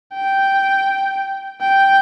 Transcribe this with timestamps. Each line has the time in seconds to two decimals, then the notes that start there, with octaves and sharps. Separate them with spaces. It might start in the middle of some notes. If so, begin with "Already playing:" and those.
0.14 G5
1.61 G5